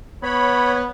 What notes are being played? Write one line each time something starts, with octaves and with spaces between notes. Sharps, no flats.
B3 C#5 B5